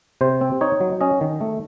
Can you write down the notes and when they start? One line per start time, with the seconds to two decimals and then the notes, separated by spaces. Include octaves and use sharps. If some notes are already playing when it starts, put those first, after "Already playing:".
0.21 C3 C5
0.41 C4
0.61 D#4 C#5
0.80 F#3
1.01 C#4 D#5
1.21 D#3
1.41 A3